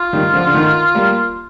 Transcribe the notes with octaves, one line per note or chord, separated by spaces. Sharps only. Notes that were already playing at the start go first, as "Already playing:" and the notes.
Already playing: F4
D#3 G3
D3 F3
D3
D#3
G3 A#3